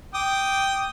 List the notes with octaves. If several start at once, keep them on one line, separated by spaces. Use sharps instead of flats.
G5 D6 D#6